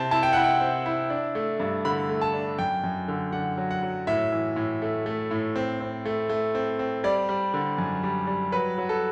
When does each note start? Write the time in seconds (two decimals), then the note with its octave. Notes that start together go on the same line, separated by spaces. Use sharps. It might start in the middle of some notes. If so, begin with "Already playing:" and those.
Already playing: C3 C4 A5
0.11 E4 A5
0.23 G5
0.33 E4 F#5
0.44 G5
0.61 C4
0.86 E4
1.10 D4
1.35 A3
1.60 G2
1.85 D3 B5
2.09 A3
2.21 A5
2.34 D4
2.58 F#2 G5
2.84 F#2
3.08 D3
3.32 D3 F#5
3.57 F#3
3.71 F#5
3.83 F#3
4.07 A2 E5
4.32 E3
4.56 A2
4.82 A3
5.06 A3
5.31 A2
5.56 C4
5.81 C4
6.05 A3
6.29 A3
6.55 C4
6.79 C4
7.04 G3 D5
7.29 G3
7.54 D3
7.78 F#2
8.03 G3
8.27 G3
8.52 F#3 B4
8.78 F#3
8.89 A4